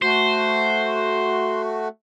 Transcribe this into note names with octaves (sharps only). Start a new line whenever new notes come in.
A3 F#4 C5